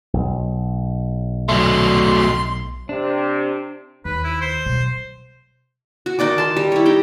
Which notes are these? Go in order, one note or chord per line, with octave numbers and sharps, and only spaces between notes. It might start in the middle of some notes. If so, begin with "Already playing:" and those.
B1
F#3 A3 C6
C3 D4
D#2 B4
E4
C5
B2 F#3
F#4
D#3 D#4 D5 D6
A5 C6
G3
E4 C#5
D#4 G4 G5